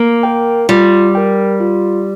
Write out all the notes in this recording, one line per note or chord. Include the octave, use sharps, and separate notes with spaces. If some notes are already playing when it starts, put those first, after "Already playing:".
Already playing: A#3
A#4 G5
G3 F4
A#4 G5
F4